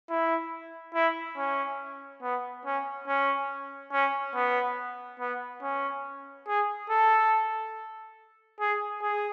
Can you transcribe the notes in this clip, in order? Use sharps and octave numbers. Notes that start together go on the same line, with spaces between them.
E4
E4
C#4
B3
C#4
C#4
C#4
B3
B3
C#4
G#4
A4
G#4
G#4